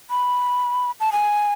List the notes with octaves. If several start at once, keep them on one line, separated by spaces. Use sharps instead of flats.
B5
A5
G#5